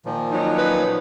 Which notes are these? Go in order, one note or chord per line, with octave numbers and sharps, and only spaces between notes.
A#2 D#3 F3
F#3 C#4 D#4
B4